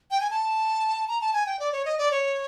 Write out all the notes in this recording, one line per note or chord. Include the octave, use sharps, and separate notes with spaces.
G5
G#5
A5
A#5
A5
G#5
G5
D5
C#5
D#5
D5
C#5